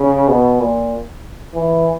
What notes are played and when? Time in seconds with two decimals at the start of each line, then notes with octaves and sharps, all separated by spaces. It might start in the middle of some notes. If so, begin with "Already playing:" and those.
Already playing: C#3
0.28 B2
0.60 A#2
1.55 E3